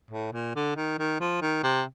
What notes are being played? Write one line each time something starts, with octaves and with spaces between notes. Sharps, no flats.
A2
A#2
D3
D#3
D#3
F3
D#3
C3